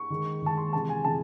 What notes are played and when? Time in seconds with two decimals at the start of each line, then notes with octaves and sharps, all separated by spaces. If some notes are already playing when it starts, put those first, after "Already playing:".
Already playing: C#6
0.10 D#3 G#3
0.42 D#3 G#3 A5
0.57 C6
0.73 C3 E3 G#3 A5
0.89 G#5
1.05 C3 E3 G#3 A5